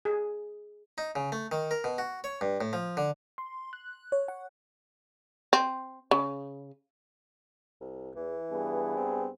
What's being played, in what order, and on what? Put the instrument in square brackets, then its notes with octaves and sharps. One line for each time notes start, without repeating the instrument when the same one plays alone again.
[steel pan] G#4
[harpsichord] D#4
C#3
A3
D#3
A#4
B2
F#4
C#5
G2
A2
F3
D3
[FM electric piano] C6
F#6
C#5
F#5
[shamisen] C4
C#3
[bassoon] C2
[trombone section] E2 [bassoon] E3
[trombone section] G2 B3 G#4
[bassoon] C4